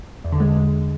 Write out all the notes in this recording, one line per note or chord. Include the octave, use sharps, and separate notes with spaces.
E2
D3
G#3